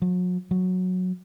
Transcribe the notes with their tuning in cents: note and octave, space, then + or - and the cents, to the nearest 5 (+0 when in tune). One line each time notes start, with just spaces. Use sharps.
F#3 -40
F#3 -10